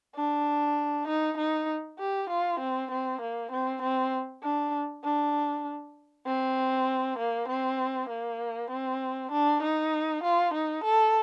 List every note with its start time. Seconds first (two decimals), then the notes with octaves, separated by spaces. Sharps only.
0.15 D4
1.07 D#4
1.37 D#4
1.99 G4
2.30 F4
2.60 C4
2.91 C4
3.21 A#3
3.51 C4
3.82 C4
4.43 D4
5.04 D4
6.26 C4
7.18 A#3
7.48 C4
8.09 A#3
8.70 C4
9.32 D4
9.62 D#4
10.24 F4
10.54 D#4
10.84 A4